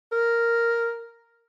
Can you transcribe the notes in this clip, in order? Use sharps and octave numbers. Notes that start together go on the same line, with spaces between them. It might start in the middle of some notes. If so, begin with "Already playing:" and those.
A#4